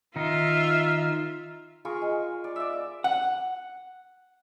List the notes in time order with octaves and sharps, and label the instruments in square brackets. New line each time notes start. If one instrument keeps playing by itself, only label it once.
[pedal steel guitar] D#3 D#4 [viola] F4 E5
[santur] F4 G#4 A#4 C#6
G#3
D5
D5 E5
[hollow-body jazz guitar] F#5